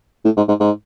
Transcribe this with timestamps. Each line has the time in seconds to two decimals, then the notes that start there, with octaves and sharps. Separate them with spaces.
0.25 A2
0.37 G#2
0.48 G#2
0.60 G#2